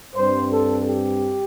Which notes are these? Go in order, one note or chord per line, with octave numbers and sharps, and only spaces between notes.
G2 G3 C4 C5
A4
G4